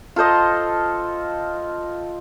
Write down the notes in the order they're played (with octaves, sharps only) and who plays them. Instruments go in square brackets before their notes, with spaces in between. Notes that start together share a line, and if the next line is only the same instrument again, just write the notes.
[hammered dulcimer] F4 A4 C5 D#5